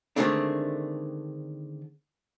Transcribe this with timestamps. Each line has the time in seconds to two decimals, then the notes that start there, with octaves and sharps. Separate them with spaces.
0.16 D3 D#3 G#3 A3 C4 D4